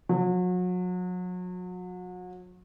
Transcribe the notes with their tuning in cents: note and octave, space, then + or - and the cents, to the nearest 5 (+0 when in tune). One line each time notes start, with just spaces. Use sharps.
F#3 -35